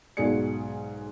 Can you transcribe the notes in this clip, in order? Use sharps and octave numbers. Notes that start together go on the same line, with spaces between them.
B1 G#2 F#4 G#4 D5 C#7